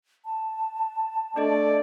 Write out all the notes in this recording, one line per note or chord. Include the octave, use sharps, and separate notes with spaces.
A5
A3 D4 A4 D5 D#5